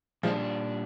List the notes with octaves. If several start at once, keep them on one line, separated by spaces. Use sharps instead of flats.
A#2 F3 G3 G#3 D4